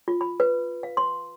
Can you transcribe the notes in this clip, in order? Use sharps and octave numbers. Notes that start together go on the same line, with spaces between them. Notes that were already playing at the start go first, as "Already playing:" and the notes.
F4
B5
B4
F5
C6